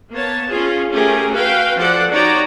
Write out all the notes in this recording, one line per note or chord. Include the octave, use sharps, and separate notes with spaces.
A#3 B3 C#5 A5
C#4 F4 G#4
A3 C#4 G4 G#4 A#4
F#4 B4 F5 G5
F3 A4 D5 F#5
D#4 F#4 G4 C#5 D5 A#5